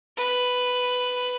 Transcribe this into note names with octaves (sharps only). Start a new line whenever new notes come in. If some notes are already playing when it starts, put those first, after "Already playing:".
B4